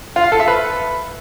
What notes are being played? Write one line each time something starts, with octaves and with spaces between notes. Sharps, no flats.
F4
F5
A4
E5
B4